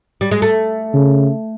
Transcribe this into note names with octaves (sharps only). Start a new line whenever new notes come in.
G3
G#3
A3
C#3